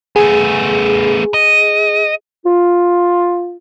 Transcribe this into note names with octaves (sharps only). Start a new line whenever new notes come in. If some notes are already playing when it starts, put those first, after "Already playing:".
A3 B3 G#4
D#5
F4